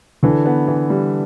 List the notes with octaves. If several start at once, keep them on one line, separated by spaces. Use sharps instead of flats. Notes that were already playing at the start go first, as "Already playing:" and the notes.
D3 E3
B3
E3
G3